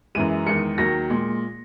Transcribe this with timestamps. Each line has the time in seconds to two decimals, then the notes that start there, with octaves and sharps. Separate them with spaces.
0.15 F#2 E3 G#3 D#7
0.46 E2 D#3 G#3 C#7
0.78 D#2 D#3 F#3 A#6
1.10 A#2 G#3